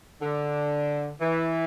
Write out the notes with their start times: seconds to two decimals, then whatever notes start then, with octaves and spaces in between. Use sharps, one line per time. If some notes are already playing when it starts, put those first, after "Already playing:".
0.22 D3
1.21 E3